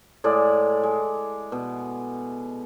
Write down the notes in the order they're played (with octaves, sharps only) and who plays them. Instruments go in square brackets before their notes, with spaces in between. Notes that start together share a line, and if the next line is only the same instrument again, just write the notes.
[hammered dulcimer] A2 G#3 D5
G#3
B2